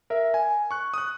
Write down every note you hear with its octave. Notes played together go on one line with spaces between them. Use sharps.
A#4 E5
G#5
C#6 F#6
D#6 F#6